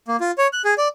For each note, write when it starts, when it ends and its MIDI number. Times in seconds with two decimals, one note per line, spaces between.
0.08 0.17 58
0.20 0.31 65
0.38 0.47 73
0.53 0.62 90
0.65 0.74 68
0.78 0.88 74